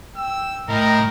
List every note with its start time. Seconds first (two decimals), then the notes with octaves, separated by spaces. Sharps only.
0.16 G5 E6
0.69 A2 A#4 D#5 G5 A#5